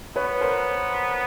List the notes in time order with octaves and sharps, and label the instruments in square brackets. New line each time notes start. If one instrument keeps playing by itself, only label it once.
[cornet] B3 [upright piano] B4 C#5
[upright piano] A#4 C5